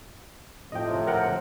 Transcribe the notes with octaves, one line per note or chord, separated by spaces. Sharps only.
A2 C3 F3 D#5 G5
A#4 F#5 G5